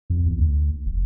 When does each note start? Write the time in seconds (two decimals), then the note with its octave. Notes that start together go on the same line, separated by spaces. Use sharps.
0.10 F2
0.26 E2
0.38 D2
0.86 F1